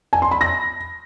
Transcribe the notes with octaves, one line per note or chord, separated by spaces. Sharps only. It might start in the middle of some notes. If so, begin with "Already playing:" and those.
G#5
C6
B5
A#6